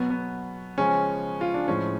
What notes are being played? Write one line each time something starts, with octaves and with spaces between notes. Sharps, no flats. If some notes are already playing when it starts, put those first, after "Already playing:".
Already playing: B2 F#3 B3
B3
C#3 F3 G#3 C#4
F4
D4
A2 F3 G#3 C#4